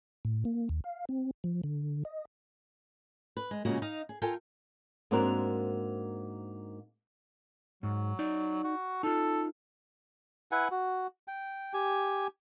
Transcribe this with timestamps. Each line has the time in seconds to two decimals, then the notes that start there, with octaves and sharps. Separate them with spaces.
0.25 A2
0.45 A#3
0.69 D#2
0.84 F5
1.09 C4
1.44 F3
1.64 D3
2.05 D#5
3.37 B4
3.51 G#3
3.65 A#2 C#3 G#3 A#3 F#4
3.82 D#4 D#5 F5
4.09 G#4
4.22 F4 A4 A#4 G5 G#5
5.11 G#2 A#3 C4 D4 F#4 A#4
7.83 G#2 F#3
8.19 D#4 D5
8.64 F#4
9.03 D#4 F4 A4
10.51 E4 B4 F#5 G#5
10.71 F#4
11.28 G5
11.73 G4 G#5